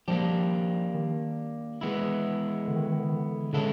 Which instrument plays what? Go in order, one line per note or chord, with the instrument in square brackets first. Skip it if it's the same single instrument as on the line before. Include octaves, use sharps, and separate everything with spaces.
[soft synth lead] F3 [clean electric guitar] G3 A#3 D4 G4
[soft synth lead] D#3
[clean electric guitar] E3 G#3 B3 E4
[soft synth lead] D3
D#3
D3
D#3
D3
D#3
D3
[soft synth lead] D3 [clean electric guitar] E3 G#3 C#4 E4 A4